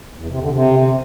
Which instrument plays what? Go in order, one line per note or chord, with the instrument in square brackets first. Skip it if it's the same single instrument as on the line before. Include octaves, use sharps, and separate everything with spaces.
[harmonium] E2
C3
D3
C3